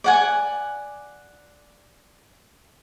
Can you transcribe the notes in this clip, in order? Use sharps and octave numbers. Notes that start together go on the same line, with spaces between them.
D5 F#5 G#5